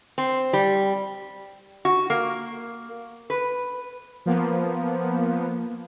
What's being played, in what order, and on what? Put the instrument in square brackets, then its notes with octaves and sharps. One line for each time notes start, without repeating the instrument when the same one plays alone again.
[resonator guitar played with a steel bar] C4
G3
F#4
A#3
B4
[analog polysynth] F3 A#3 B3